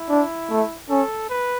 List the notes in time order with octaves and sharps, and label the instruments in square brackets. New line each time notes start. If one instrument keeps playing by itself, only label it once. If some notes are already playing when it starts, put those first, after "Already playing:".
Already playing: [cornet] E4
[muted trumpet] D4
A3
[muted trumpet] C#4 [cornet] A4
[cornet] B4